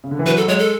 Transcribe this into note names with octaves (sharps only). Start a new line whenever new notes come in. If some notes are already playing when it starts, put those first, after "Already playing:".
C#3
D3
E3
F#3 B4
A4
F#3
G#3 C#5
A4